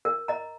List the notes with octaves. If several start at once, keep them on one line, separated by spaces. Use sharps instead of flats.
A#4
D#5 A#5